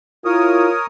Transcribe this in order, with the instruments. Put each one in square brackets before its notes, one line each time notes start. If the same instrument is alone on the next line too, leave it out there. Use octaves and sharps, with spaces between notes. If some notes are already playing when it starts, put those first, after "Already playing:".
[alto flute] E4 [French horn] F4 [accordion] A#4 C#5 D#6